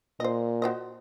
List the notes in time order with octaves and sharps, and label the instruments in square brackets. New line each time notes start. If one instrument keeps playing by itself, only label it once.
[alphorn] A#2 [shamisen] C5 D#5
[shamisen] F#4 C5 D#5